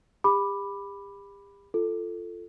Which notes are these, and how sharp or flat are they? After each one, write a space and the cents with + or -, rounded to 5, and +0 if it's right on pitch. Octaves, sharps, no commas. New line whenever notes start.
G4 +40 B5 +0 D6 +10
F4 -10 A4 +0